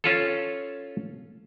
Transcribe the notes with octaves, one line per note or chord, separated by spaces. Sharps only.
C#4 F4 A4